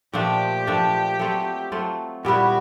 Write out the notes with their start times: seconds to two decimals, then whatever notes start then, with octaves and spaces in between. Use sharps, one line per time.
0.13 A#2 F3 A3 D4 G4
0.67 A#2 F3 A3 D4
1.19 F#3 A3 C4 F4
1.72 F#3 A3 C4 F4
2.24 A#2 G3 B3 E4 F#4